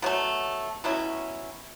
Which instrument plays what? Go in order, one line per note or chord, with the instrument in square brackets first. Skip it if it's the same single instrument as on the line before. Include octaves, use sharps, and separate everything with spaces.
[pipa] B2 F#3 A3
B2 F#3 C#4 E4